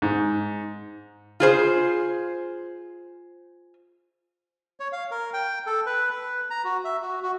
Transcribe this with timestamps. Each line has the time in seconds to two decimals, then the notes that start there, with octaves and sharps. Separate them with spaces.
0.02 G#2
1.40 F4 G#4 C5
4.80 C#5
4.93 F5
5.11 A#4
5.33 G5
5.67 A4
5.86 B4
6.10 B4
6.50 A#5
6.64 F#4
6.84 E5
7.02 F#4
7.23 F#4